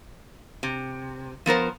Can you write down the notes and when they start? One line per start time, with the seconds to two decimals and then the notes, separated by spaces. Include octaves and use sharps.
0.63 C3
1.46 F3 B3 A#4 C5